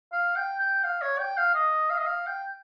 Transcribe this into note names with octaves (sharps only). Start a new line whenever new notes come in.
F5
G5
G5
F5
C#5
G5
F5
D#5
F5
D#5
F5
G5